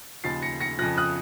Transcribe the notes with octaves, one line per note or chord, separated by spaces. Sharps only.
D#2 C#3 F3 A6 C7
A#6 C#7
A#6 C#7
F2 C#3 F3 F#6 A#6
D#6 F#6